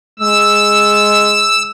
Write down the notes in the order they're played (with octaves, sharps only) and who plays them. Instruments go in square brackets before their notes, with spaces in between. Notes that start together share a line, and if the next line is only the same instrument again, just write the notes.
[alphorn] G#3 [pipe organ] E6